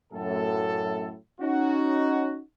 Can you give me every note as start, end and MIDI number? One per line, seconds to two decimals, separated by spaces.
0.13 1.15 42
0.13 1.15 45
0.13 1.15 69
1.41 2.40 61
1.41 2.40 63
1.41 2.40 66